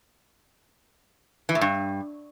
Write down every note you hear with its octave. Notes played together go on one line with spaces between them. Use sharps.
E3
A2
G2